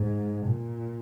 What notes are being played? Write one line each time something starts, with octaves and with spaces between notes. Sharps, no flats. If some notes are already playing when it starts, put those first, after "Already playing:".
Already playing: G#2
A#2